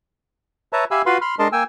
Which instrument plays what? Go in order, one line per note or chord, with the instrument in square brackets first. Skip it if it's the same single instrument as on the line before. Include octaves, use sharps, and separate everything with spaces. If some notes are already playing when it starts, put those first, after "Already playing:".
[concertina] B4 C#5 E5 A5 A#5
G4 E5 F5 G#5 B5 E6
F4 F#4 B4 F5 B5 C6
B5 C6 F6
G#3 D4 A#4 D#5 A5 C6
A#3 G5 G#5 E6